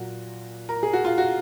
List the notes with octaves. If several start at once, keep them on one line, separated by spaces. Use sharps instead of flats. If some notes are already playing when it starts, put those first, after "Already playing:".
Already playing: A#2 F#3 F#4
A#4
G#4
F#4
F4
F#4